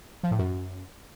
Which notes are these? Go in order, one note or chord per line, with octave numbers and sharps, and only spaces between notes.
F3
A2
F#2